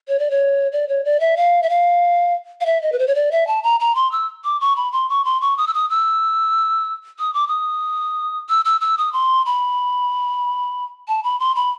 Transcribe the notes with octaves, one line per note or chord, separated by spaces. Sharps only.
C#5
D5
C#5
D5
C#5
D5
E5
F5
E5
F5
F5
E5
D#5
B4
C5
C#5
D5
E5
A5
A#5
A#5
C6
E6
D6
C#6
B5
C6
C#6
C6
C#6
D#6
E6
D#6
E6
D#6
D6
D#6
E6
E6
E6
D#6
C6
B5
A5
B5
C6
B5